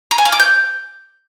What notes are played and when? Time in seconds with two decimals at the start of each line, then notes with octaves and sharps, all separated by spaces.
0.11 A#5
0.18 G#5
0.25 F5
0.32 D6
0.40 G6